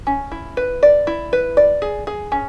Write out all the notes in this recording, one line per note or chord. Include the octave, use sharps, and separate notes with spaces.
C#4
E4
B4
D5
E4
B4
D5
G#4
G#4
C#4